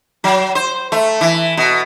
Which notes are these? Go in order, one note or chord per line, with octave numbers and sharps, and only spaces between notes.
F#3
C5
A3
E3
B2